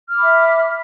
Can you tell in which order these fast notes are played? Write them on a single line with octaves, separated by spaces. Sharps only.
F6 D6 B5 E5